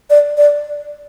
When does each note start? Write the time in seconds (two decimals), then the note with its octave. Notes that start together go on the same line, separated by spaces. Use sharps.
0.10 D5
0.37 D5